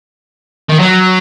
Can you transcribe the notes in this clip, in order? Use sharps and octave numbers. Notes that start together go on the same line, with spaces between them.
D#3
F#3